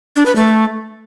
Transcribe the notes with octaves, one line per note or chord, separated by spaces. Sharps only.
D4
B4
A3